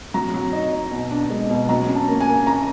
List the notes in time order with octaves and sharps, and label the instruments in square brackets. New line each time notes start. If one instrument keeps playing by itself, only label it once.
[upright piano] F#3 [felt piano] A#5
[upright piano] F#3
D#4
D#4
B2
D4
G#3
B2
[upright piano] F#3 [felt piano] A#5
[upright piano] C#4
[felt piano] A5
[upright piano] A#3
[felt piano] G#5
[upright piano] A#3
[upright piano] C#4 [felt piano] A#5